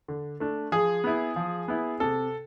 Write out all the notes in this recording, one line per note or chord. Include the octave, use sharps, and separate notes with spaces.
D3
A3 D4
F3 G#4
B3 E4
F3
B3 E4
C3 A4